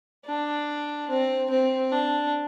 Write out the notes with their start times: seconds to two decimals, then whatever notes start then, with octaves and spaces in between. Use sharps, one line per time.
0.26 D4
1.09 C4
1.50 C4
1.92 D4